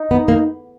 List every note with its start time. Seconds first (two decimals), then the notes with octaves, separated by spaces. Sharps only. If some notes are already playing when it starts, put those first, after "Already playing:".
Already playing: D#4
0.11 B3
0.28 A#3